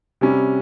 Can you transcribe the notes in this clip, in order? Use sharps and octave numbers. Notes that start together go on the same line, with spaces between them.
C3 G3 C#4